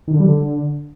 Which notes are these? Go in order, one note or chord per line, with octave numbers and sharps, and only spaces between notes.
D#3
D3
G3
D3